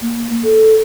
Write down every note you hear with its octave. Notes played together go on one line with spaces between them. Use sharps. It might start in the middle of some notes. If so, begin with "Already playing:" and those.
A#3
A4